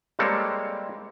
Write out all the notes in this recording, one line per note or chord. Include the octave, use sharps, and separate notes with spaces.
G3 G#3 A#3 C4 A4 C#5